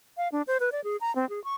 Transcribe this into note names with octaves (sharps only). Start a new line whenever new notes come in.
F5
D4
C5
B4
D5
G#4
A#5
C4
G#4
C#6